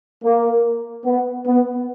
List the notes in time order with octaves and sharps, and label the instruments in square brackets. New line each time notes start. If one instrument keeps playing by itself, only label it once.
[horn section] A#3
B3
B3